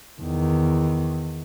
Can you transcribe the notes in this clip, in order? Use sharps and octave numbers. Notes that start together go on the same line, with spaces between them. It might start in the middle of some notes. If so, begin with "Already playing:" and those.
E2 D#3